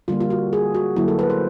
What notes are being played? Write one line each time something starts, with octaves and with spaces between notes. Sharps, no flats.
D3 G3 A#3 F4
F4
F#4
G#4
F#4
D3 F#3 A#3 E4
A4
B4
C5